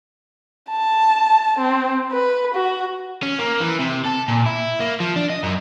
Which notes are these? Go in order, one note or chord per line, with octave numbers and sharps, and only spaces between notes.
A5
C4
B4
F#4
C#4
A#3
E3
C3
A4
A#2
E4
A#3
F3
D4
D#5
F#2